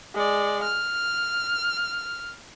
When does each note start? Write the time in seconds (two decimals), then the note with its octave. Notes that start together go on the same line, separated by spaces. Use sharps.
0.15 G#3 D5
0.63 F6